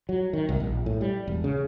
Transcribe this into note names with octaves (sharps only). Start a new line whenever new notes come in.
F#3
D#3
C2
A#1
A2
G3
E1
C#3